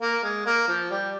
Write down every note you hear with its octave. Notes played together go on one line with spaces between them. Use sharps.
A#3
G#3
A#3
F3
G3